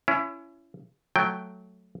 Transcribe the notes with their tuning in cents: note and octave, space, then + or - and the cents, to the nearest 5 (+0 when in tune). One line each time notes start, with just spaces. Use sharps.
C#4 +15 E4 +30
F#3 +0 A3 -5 G5 +0